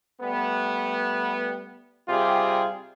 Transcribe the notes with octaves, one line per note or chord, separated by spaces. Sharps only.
G3 A3 B3
C3 G3 F4 G4 G#4